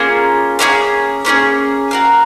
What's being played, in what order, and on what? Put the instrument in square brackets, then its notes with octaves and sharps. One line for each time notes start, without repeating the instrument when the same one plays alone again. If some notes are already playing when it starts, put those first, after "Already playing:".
Already playing: [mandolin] A#3 C#4 F4 G#4
A#3 C#4 F4 G#4
A#3 C#4 F4 G#4
F#4 A#4 F5